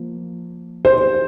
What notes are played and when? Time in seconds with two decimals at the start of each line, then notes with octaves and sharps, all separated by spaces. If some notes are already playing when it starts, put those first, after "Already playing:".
Already playing: F3 A#3
0.85 C5